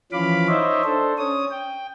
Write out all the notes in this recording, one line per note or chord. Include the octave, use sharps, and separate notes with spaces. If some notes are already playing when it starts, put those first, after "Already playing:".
E3 F3 C#4 F5 B5 D6
D#4 C5 C#5 D#5 E5
D4 A4 C5
C#4 C#5 D#6
G5